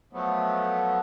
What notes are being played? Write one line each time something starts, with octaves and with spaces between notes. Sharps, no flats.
F3 F#3 A3 B3